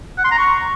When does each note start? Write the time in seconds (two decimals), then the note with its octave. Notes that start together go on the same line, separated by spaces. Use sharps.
0.18 F#5
0.25 C6
0.31 A#5
0.38 C#6